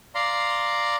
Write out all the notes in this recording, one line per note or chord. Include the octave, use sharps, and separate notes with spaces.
D5 F5 A#5 C6